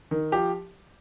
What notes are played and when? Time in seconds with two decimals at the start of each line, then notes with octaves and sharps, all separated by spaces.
0.11 D#3
0.32 F3 G4